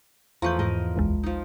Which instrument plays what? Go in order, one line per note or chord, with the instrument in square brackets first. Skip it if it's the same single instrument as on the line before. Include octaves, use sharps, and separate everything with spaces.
[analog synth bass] E2 [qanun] F3 A3 B4 [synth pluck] A#5 C#6 G6
[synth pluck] G#2 [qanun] A#4 B4 D#5
[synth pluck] G#1 D2 G#3
[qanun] F3 D#4